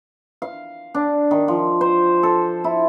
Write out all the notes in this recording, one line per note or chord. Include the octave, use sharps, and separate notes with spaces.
F5
D4
D#3
F3
C5
A4
E4